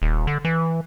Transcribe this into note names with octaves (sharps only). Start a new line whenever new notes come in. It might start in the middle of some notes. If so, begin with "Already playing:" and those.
D#1
D3
E3